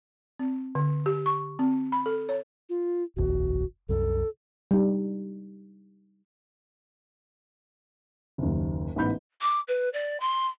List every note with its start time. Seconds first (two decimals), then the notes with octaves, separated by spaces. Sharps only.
0.39 C4
0.75 D3
1.06 G4
1.26 C#6
1.59 C4
1.92 B5
2.06 A4
2.29 C#5
2.69 F4
3.16 F1 A#1 D#2 F#4
3.89 C2 F#2 A4
4.71 G3 D#4
8.38 F#1 D#2
8.96 A1 G#2 B3 B5 G6
9.41 D6
9.68 B4
9.93 D5
10.20 C6